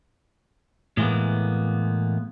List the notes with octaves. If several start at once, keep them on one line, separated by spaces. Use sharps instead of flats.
A2 E3 G#3 A#3 B3